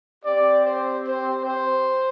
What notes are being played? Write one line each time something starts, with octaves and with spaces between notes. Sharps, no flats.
C4 G4 D5
C5
C5
C5